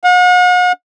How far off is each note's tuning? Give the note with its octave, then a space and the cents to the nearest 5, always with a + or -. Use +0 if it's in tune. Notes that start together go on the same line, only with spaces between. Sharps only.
F#5 -45